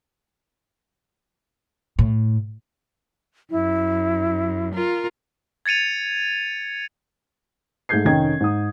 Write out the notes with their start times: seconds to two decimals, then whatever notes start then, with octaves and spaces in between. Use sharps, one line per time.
1.99 A2
3.51 F#2 E4
4.73 F4 A#4
5.66 G#6 A6 C#7 D#7 F7
7.89 G#2 A3 G#4 G6 G#6 C7
8.05 F1 D#3 C#4 D#4 G5 G#6
8.41 G#2 D#6